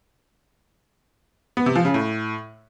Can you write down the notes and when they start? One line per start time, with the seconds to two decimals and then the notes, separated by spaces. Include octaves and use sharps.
1.57 B3
1.66 C3
1.76 F3
1.85 C#3
1.94 A2